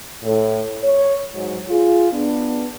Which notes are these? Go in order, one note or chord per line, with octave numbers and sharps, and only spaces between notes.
A2
C#5
G#2 F#3
F4 G#4
B3 D4